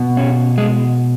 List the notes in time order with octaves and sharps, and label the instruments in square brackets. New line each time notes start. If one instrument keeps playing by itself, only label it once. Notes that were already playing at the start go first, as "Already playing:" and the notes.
Already playing: [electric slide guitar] B2
C#4
G#3